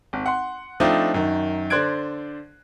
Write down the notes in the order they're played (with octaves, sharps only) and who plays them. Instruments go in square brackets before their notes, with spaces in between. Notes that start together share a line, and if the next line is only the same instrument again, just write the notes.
[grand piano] G#1
F#5 C6
F3 A3 C4 D4 D#4 F4
F#2 D#3
D3 C5 D5 F#6 G#6 D7